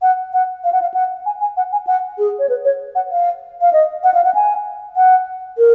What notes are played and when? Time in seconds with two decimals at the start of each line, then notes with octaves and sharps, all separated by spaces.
0.02 F#5
0.33 F#5
0.64 F5
0.73 F#5
0.82 F5
0.94 F#5
1.26 G#5
1.41 G#5
1.57 F#5
1.72 G#5
1.87 F#5
2.18 G#4
2.39 C#5
2.49 B4
2.65 C#5
2.95 F#5
3.11 F5
3.61 F5
3.73 D#5
4.04 F#5
4.14 F5
4.24 F#5
4.34 G#5
4.96 F#5
5.58 A#4